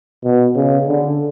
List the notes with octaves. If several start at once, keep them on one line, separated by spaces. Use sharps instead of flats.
B2
C#3
D3